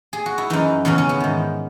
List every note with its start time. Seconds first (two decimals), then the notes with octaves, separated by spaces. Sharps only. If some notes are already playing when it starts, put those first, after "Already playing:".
0.13 G#4
0.26 F#4
0.38 E4
0.50 F#2 E3 D#4
0.85 E2 C#3 E3 C#4
0.98 C#4
1.09 B3
1.20 G#2 D#3